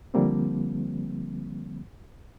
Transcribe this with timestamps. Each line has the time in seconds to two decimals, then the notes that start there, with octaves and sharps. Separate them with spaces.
0.14 D3 F3 G3 A#3 C4